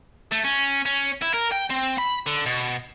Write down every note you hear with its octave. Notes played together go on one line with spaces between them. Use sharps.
A3
C#4
C#4
E4
A#4
G5
C4
B5
D3
B2